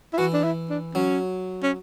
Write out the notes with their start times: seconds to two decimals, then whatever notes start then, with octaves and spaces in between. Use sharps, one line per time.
0.13 E4
0.18 E3 F#4
0.33 D4
0.44 E4
0.70 D4
0.95 F#3 C#4
1.63 C#4